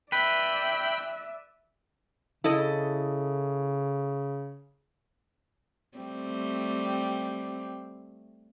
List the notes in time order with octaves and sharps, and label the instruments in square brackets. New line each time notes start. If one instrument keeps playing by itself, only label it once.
[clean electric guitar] B4 [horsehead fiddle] D5 E5 [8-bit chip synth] G5 B5
[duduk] C#3 [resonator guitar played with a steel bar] E4 A4 D#5
[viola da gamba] G3 A3 C4